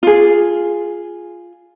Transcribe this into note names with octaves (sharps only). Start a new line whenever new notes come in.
F4 G#4